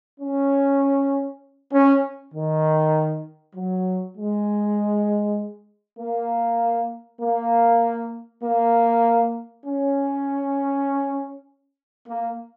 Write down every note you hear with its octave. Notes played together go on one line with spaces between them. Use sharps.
C#4
C#4
D#3
F#3
G#3
A#3
A#3
A#3
C#4
A#3